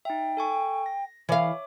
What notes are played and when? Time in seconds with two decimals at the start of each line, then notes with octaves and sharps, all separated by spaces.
0.05 D#4 E5 G5
0.37 A4 G#5 C#6
0.86 A#6
1.29 E3 C#5 E5 F5 D6